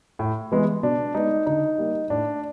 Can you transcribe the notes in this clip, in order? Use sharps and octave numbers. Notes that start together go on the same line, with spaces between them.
A2
E3 G#3 B3
B2 D4
G#3 B3 D#4
D3 D#4
G3 A#3
A2 D4